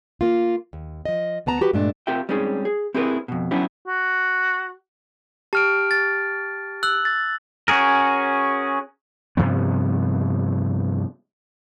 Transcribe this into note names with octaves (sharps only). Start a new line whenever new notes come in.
A#3 F4
D#2
F3 D#5
D2 B3 A5 A#5
F#4 G4 B4
G2 A#2 G#3 A3 D4
C4 F4 G4 A#4 E5 G5
G3 G#3 C4 C#4 D#4 G#4
G#4
C4 E4 G4 G#4 A#4 B4
F2 B2
F#3 B3 C#4 D4 E4 G4
F#4
G4 A5 F6 D7
A6
E6 F#6 F#7
A6
C#4 F#4 G#4 A#4
G2 C3 F3 B3